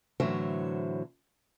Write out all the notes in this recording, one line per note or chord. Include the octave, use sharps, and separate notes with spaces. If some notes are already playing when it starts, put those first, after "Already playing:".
A2 D3 E3 F#3 C5 E5